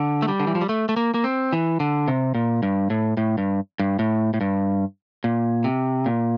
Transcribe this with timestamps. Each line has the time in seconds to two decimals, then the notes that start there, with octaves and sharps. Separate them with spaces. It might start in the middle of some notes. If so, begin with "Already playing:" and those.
Already playing: D3
0.22 A3
0.28 G3
0.40 D3
0.47 E3
0.55 F3
0.61 G3
0.69 A3
0.89 A3
0.96 A#3
1.14 A#3
1.24 C4
1.53 E3
1.80 D3
2.08 C3
2.35 A#2
2.63 G2
2.90 A2
3.17 A2
3.38 G2
3.79 G2
3.99 A2
4.34 A2
4.41 G2
5.24 A#2
5.64 C3
6.06 A#2